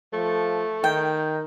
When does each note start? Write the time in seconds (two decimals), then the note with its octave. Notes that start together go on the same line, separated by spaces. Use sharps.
0.13 F3 A3
0.84 D#3 G5